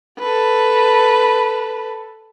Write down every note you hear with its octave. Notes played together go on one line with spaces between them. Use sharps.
A4 B4